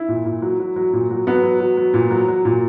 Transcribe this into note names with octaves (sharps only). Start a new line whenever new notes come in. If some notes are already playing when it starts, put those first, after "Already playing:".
Already playing: E4
A#2
A#2
F#3
F#3
F#3
A#2
F#3
F#3 B3
F#3
F#3
F#3
A#2
F#3
F#3
A#2